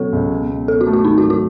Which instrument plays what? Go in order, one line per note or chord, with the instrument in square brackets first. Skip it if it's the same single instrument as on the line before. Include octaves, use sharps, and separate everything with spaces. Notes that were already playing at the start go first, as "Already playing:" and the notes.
Already playing: [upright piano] B2 F#3 C#4 [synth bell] A4
[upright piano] C#2
B2
B2
[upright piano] B2 [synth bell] A4
[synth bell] F#4
[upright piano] A3
[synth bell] F#4
[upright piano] G#1 [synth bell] D#4
[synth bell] F#4
[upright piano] F#3
[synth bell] F#4